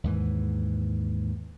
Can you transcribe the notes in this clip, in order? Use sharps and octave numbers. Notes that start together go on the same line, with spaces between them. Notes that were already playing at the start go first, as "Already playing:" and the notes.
D#2 G#2 E3